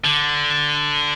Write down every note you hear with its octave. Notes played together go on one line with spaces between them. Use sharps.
D3